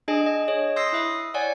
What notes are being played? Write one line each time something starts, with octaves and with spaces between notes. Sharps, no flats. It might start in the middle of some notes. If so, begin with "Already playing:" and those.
D4 G#4 D#5 G#5
D#5
G#4 C#5 D#5
C6 D#6 E6 G6 A#6 C7
E4 E5 D#6
C#5 D5 F#5 G#5